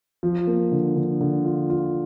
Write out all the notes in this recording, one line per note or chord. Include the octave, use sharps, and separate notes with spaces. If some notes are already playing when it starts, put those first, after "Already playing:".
F3
A#3
D3
D3
D3
F4
F4